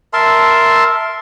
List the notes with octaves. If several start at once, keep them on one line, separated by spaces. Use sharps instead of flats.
A#4 E5 A5 C6